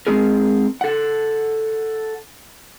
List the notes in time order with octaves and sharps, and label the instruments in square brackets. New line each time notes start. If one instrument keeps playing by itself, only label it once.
[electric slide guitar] G#3 C4 G#4 A#4
A4 F#5